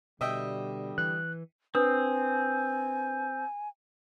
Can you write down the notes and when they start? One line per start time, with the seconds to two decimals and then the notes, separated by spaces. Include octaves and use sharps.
0.21 B2 D3 G3 D#5 E5 G5
0.98 E3 F#6
1.75 C4 D4 B4 G#5 D#6